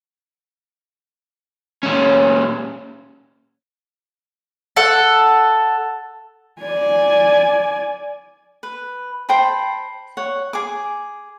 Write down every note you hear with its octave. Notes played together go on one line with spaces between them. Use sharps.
A#2 C#4
A4 F#5
D5 G#5
B4
C5 G5 A5 B5
C#5 F#5
G#4 D6